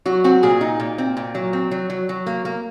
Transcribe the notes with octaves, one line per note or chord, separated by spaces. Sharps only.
F#3 F#4
C4 F#4
A#2 G#4
D#4
A#2
C4
A#2
F#3
C4
F#3
F#3
F#3
A#3
A#3